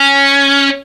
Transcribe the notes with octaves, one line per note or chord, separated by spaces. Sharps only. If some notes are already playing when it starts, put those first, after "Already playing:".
Already playing: C#4